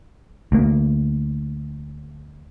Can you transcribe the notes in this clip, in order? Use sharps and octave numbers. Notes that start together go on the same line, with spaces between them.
D2 A#3